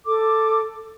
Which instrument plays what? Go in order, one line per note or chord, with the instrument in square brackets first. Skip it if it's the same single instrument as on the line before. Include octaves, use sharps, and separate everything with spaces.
[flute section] A4 D6